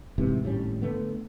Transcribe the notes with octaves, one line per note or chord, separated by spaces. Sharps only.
A1 G#2 C3 E3
G#1 A2 G3 C#4
D3 A3 B3